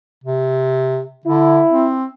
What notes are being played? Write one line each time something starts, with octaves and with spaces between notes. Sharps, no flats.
C3
D3 E4
C4